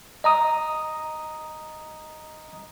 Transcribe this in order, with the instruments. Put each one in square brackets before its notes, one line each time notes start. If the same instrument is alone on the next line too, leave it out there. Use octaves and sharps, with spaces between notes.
[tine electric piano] D#5 A#5 D#6